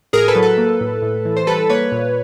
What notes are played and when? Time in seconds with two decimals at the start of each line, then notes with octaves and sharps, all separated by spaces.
0.13 A2 G#4 A#4
0.28 A4 B4
0.35 F#3
0.42 A4 B4
0.58 A#3
0.81 A2
1.02 A2
1.25 E3
1.37 C5
1.47 G3 A4 B4
1.70 A#3 B4 C#5
1.92 A#2